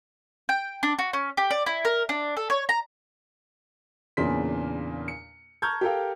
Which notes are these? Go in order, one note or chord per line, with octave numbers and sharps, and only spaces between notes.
G5
D4
F#4
C#4
G4
D5
E4
A#4
D4
A4
C#5
A#5
E2 A#2 C#3 D4 C6 B6
C#7
A5 A#5 C#6 F6 G6 G#6
G4 A4 A#4 F5 G5